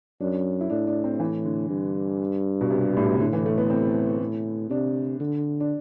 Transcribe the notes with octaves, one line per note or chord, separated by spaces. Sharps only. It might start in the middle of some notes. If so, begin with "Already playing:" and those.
F#2 D4
E4
A2 D4
D4
C4
E3
D3
G2
B2
C3
A2
B2
C3
A2 D3
E3
A3
B3
C4
A2
C3 D4
D3
D4